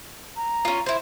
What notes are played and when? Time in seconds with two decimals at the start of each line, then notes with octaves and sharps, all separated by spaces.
0.36 A#5
0.65 C#4 F4
0.86 E4 C5